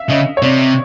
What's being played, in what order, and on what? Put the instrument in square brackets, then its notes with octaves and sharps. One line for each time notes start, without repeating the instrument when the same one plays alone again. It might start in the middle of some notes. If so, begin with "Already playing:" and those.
Already playing: [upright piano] E5 F5
[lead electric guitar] C#3 [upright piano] D#5
[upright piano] C#5
[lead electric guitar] C3 [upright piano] D5